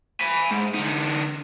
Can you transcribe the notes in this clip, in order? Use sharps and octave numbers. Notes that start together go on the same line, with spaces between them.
G#5 B5
G#2
D3 D#4